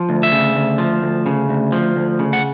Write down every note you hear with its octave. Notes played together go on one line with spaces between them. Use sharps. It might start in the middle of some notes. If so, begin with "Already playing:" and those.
Already playing: F3
D2
E5
C#3
D2
F3
D2
C#3
D2
F3
D2
C#3
F#5